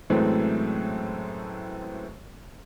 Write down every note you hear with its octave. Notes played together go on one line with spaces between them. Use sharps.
F#2 A2 E3 G#3 A3 C4